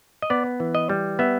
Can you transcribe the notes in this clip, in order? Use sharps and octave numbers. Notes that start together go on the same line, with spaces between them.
D#5
B3 D5
E3
D#5
G3
B3 E5